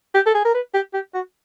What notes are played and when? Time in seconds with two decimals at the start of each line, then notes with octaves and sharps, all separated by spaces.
0.14 G4
0.26 A4
0.34 G#4
0.45 A#4
0.54 B4
0.74 G4
0.93 G4
1.14 F#4